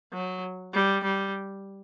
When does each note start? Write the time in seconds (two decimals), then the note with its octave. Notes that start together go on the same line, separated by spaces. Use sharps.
0.13 F#3
0.73 G3
1.04 G3